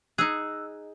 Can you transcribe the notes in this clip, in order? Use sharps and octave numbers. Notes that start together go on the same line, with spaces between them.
D#4 G#4 E6 F#6